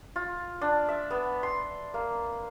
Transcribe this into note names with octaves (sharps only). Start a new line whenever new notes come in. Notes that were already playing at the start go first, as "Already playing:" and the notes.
F4
D4
E5
B3
C6
A#3